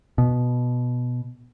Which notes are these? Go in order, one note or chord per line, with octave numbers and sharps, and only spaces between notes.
B2